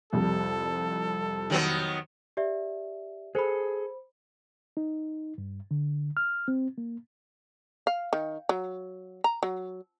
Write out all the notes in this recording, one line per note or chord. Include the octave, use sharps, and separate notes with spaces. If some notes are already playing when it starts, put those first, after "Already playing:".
C2 F2 G3 A4
D#3 F#3 B3
G4 D5 E5
G#4 A4 C5 B5
D#4
G2
D3
F6
C4
A#3
F5
D#3
F#3
A#5
F#3